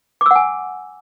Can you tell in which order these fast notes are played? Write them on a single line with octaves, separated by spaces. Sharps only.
D6 E6 F#5 G#5